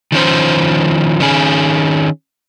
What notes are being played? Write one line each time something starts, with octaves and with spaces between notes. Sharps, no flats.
D#3 F3 C#4 C5
D#3 C#4 G#4